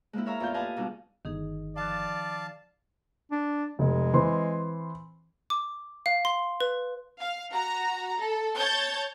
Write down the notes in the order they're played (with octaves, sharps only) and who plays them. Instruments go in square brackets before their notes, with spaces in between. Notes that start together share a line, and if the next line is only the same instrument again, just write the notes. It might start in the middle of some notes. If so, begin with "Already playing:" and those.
[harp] G#3 A#3 C4 E4
A#4 C#5 E5 F5 A#5
E2 A2 F4 F5 C6 G6
G4 B4 D#5 F5 G#5 A5
G#2 B2 G3 D#4
[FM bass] G1 [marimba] D#3 D#4 G#4
[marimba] F3 D6 F#6 [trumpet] D5 [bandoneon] F5 A5
[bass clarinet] D4
[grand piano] F1 [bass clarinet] G#3
[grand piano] E3 C4 C6
[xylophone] D6
F5
C6
B4
[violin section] F5
F#4 A#5
A4
C#5 A5 G6 A6